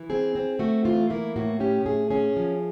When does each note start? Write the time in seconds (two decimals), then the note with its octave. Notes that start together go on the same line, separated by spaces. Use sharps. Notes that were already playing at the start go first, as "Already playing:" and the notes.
Already playing: E3
0.10 C4 G#4
0.35 C4
0.59 A3 F#4
0.85 E3 F4
1.10 A#3 E4
1.36 A2 F#4
1.60 C#4 G4
1.86 A2 G#4
2.11 C#4 G#4
2.37 F3